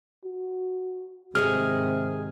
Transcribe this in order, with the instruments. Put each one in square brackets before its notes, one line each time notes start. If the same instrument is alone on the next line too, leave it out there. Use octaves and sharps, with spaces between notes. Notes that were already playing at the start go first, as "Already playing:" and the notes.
[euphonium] F#4
[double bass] G#2 D#3 [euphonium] C3 [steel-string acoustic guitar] G#4 D#5 G#5 [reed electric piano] F6